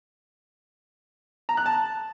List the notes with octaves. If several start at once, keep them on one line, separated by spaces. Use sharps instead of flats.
A#5
F#6
A5